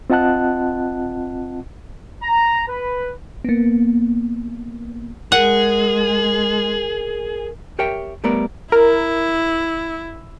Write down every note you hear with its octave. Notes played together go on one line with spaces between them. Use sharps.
C4 F4 D#5 F#5 A5 F#6
A#5
B4
A#3 B3
G#3 G#4 A#4 F#5
G4 A#4 C#5 E5 G5
G3 A3 B3 A#4 C#5 D5
E4 A#4